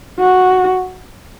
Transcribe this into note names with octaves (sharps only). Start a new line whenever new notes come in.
F#4